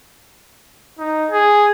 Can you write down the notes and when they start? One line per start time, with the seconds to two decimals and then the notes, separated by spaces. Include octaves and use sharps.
0.99 D#4
1.30 G#4